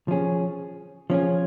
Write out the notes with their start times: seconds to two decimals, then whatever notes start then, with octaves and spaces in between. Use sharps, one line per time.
0.08 F3 C#4 G#4
1.10 F3 C#4 F4 G#4